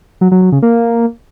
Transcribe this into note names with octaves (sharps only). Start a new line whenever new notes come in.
F#3
F#3
F#3
C#3
A#3